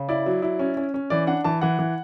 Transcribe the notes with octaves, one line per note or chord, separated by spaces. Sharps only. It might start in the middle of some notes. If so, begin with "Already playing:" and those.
Already playing: C#3
E4 D5
F#3
E4
C#4
C#4
C#4
E3 D5
D4 F#5
E3 A5
E3 F#5
E3